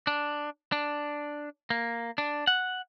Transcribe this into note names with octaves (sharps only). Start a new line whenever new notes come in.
D4
D4
A#3
D4
F#5